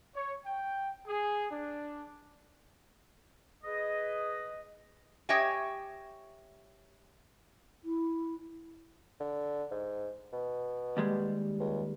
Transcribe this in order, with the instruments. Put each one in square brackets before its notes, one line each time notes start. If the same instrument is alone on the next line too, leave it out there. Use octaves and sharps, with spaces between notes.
[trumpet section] C#5
G5
G#4
D4
[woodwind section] G#4 B4 D#5
[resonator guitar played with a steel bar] G4 C#5 D#5 E5 G5 G#5
[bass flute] E4
[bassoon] D3
G#2
B2
[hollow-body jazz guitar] D#2 G3 G#3
[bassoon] C#2